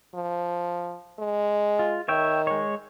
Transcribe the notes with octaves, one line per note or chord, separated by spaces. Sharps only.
F3
G#3
F4
D#3 C#5 E5 G5
G#3 C#5